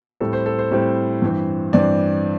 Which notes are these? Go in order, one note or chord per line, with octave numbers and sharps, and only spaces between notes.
A2 G3 C4 A4
C5
A4
C5
A2 G3 C4
G2 E3 C4
G2 E3 C4 D5